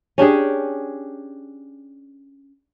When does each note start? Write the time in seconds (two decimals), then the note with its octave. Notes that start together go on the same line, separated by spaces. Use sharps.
0.18 C#4 D4 G4 G#4